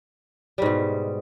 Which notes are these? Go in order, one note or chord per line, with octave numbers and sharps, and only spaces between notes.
G#2 B2 G3